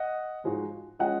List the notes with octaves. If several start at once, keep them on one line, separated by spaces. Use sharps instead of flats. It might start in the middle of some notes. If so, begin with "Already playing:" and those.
Already playing: D#5 F#5
G#2 F3 G#3 D#4 F#4
F3 G#3 C#4 F4 D#5 F#5